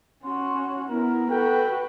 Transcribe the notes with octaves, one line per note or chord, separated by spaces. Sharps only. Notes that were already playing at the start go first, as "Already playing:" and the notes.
C#4 F#4 C6
B3 E4 A#4
F#4 A4 B4 G5